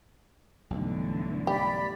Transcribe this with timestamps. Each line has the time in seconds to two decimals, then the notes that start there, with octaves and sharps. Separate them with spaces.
0.70 B1 G2 D3 E3 A3
1.47 G4 D5 B5